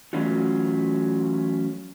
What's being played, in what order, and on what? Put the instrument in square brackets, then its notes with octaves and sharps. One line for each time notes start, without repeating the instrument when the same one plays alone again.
[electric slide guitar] E3 F#3 A3 C#4 F4 F#4